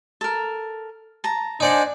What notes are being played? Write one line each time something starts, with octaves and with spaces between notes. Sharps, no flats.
A4 A#4
A5 A#5
D4 D#4 C5 D5 F#5 G#5